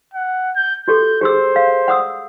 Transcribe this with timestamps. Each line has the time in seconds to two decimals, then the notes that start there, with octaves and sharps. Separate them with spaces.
0.14 F#5
0.56 G6
0.88 F#4 G4 A4 G6
1.21 G4 G#4 C5 E6
1.56 F5
1.88 F#5 D#6 E6